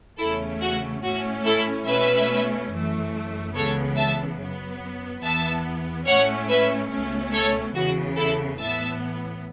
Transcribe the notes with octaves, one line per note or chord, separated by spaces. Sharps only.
E2 C#3 A3 C#4 E4 A4
F#4
A2 A3 C#4 F#4
E4 A4
B2 A3 C#4 B4 E5
F#2 E3 A3
C#2 C#3 E3 B3 A4 C#5
E5 A5
F#2 F#3 B3
E2 E3 B3 E5 A5
A2 A3 C#4 C#5 F#5
B4 E5
C#2 B2 A3 C#4
A4 C#5
E2 C#3 E3 B3 F#4
E4 A4
A2 E3 B3 E5 A5